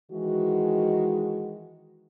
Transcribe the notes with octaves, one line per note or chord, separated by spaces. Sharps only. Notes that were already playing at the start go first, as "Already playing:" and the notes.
D#3 E3 G#3 F#4